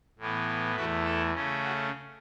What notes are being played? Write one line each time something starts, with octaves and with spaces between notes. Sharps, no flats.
A2 E3 B3
E2 E3 A3 F#4 B4
E4 A4
C#3 A3 C#4
F#4